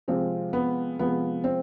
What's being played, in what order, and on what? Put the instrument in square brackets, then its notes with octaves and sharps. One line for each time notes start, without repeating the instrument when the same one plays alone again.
[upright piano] C3 F3 G#3 [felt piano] C4
[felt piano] B3
[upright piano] C3 F3 G#3 [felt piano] B3
[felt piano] C4